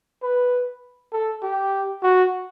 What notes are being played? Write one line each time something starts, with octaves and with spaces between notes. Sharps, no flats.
B4
A4
G4
F#4